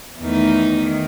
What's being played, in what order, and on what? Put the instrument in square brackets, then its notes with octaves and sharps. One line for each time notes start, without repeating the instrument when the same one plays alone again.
[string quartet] E2 D#3 A3 D#4
D#3